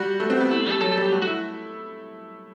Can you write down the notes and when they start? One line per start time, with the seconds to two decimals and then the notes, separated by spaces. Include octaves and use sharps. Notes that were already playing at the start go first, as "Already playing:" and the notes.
Already playing: G3 F#4
0.20 A3
0.30 C4
0.40 B3
0.50 A3 E4
0.61 C4
0.66 G3 A4
0.81 F#3 A4
0.92 A4
0.97 G3
1.02 G4
1.12 A3 F#4
1.22 E4 F#4